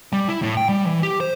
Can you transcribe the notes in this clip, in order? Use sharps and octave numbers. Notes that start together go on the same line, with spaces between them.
G3
E4
A2
G5
G3
E3
G4
C5